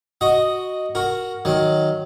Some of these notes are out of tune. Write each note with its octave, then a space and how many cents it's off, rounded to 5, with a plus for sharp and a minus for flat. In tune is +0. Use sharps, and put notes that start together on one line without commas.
F#4 +0 D#5 +0
F#4 +0 A#4 +0
D#3 +0 F#3 +0